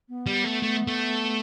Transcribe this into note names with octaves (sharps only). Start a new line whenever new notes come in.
B3
G3
A3
A3
A3